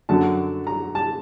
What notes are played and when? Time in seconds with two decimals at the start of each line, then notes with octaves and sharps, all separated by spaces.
0.09 F#2 D3 F#3 A5
0.67 A#5
0.95 A5